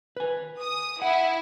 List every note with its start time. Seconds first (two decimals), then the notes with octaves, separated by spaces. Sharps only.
0.17 B4 G#5
0.60 D#6
1.02 E4 F#5